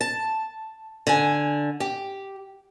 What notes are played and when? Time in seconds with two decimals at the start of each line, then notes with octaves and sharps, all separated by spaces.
0.01 A5
1.07 D3 G#5
1.80 G4